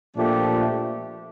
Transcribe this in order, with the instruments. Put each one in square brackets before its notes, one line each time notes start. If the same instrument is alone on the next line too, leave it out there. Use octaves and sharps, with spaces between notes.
[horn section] A#2 F3 A3 D4 G4